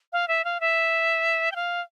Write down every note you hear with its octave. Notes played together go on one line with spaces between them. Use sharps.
F5
E5
F5
E5
G5
F5